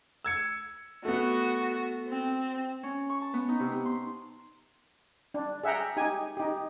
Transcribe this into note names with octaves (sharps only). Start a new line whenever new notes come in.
E6 G#6 C#7
A3 B3 F#4
C4
C#4
C#6
A5
B3
D#4
C3
B3
C6
D4
G#4 E5 F#5 G5 A#5
D#4 G4 G#5
D#4 G4